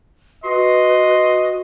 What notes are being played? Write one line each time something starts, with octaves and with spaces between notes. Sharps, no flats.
F#4 B4 D#5 C6